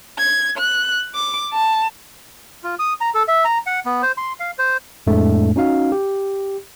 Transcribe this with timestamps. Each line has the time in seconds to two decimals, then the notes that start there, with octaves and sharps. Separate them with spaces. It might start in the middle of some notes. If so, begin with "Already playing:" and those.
0.17 G#6
0.57 F#6
1.14 D6
1.52 A5
2.64 F4
2.79 D#6
3.01 A#5
3.14 A4
3.28 E5
3.45 A#5
3.66 F#5
3.86 B3
4.02 C5
4.17 C6
4.40 F5
4.59 C5
5.07 F2 A2 G#3 A3 D4
5.56 C#4 D#4 F#4 F5
5.92 G4